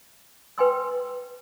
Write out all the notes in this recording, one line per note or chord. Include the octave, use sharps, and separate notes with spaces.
B4 G5 G#5 C6 E6